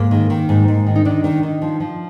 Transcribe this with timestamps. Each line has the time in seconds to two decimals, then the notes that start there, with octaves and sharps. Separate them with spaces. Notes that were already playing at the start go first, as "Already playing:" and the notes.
Already playing: G#2 A#3
0.11 D#3
0.30 D#3
0.49 G#2
0.68 G#2
0.87 D#3
0.96 D#4
1.05 D#3 D4
1.24 D#3
1.43 D#3
1.62 F3
1.80 F3